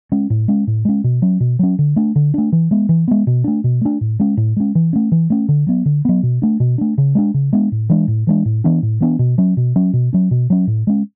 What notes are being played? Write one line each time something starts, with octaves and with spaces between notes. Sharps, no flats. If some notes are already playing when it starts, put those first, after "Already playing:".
G#3 C#4
A2
G#3 C#4
A2
G#3 C#4
B2
F#3 C#4
B2
F#3 C#4
D3
A3 D4
D3
A3 D4
E3
G#3 B3
E3
G#3 B3
B2
A3 D4
B2
A3 D4
A2
G#3 C#4
A2
G#3 C#4
E3
A3 C#4
E3
A3 C#4
D3
F#3 B3
D3
F#3 B3
B2
A3 D4
B2
A3 D4
C#3
G#3 B3 D4
C#3
G#3 B3 D4
A2
E3 G#3 D4
A2
E3 G#3 D4
A2
E3 B3 D4
A2
E3 B3 D4
B2
F#3 C#4
B2
F#3 C#4
B2
F#3 C#4
B2
F#3 C#4
A2
G#3 C#4